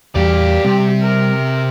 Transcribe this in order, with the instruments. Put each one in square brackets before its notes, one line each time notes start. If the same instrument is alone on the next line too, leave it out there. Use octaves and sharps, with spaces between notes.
[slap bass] E2 G3 [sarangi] G4 [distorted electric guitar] D5 F5
[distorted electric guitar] C3 [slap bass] G3
[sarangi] A#4